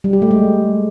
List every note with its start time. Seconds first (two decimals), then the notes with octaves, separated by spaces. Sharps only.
0.04 G3
0.13 G4
0.22 A3
0.31 G#3